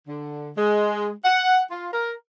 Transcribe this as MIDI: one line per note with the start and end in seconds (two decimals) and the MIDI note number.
0.08 0.49 50
0.57 1.10 56
1.24 1.60 78
1.70 1.87 65
1.92 2.13 70